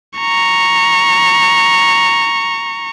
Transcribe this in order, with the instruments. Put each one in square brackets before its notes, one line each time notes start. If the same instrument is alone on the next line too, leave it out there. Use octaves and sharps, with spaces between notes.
[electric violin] A#5 C#6